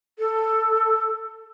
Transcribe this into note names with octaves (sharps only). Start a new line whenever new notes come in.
A4